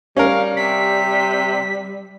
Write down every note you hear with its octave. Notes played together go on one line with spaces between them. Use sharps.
G3 C#4 A#4 F5
C3 B6